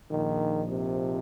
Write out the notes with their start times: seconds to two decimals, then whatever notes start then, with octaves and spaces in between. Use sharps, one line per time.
0.10 A#1 A#2 D#3 F3 D#4
0.70 C3